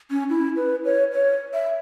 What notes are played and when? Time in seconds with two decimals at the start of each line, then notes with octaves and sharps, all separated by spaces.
0.11 C#4
0.30 E4
0.56 B4
0.85 C#5
1.12 C#5
1.54 E5